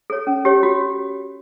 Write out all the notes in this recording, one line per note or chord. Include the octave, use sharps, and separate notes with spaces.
A4 C#5
C#4
G4 C#5
F#4